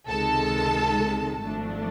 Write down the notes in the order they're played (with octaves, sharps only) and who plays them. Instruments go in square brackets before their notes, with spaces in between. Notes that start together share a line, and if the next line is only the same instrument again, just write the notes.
[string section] C#2 C3 D#3 G#3 A4 A5
G#1 G#2 F3 A3 D4